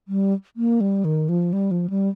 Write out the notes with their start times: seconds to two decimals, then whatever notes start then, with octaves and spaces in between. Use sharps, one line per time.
0.08 G3
0.56 A#3
0.81 G3
1.05 D#3
1.29 F3
1.53 G3
1.71 F3
1.90 G3